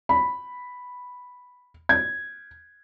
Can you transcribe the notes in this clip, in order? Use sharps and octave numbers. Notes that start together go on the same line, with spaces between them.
B5
G#6